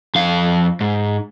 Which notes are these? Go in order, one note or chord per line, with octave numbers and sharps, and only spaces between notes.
F2 F5
G#2